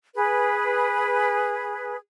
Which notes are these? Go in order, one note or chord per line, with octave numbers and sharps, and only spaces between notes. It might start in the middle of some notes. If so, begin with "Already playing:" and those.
G#4 B4